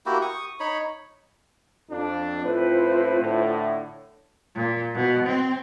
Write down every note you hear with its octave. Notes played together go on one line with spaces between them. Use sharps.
A#3 E4 F#4 G4
C#6 D#6
D#4 C#5 B5
F2 D4
A2 C4 F4 B4 C5
A2 D3
A#2
B2
C4